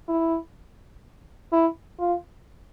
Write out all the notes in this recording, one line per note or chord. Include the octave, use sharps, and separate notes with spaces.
E4
E4
F4